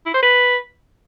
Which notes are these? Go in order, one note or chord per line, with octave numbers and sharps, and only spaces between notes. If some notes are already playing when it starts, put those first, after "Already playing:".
E4
C5
B4